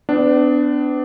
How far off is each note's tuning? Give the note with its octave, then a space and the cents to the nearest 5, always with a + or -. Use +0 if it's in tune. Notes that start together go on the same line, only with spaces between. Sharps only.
B3 +40 D4 +0